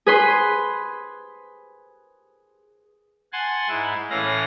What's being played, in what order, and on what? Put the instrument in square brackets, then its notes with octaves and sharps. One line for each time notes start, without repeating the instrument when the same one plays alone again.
[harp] G#4 B4 C6
[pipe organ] F#5 G#5 A5 C6
G#2 E4
A2 E3 C#4 F5 A#6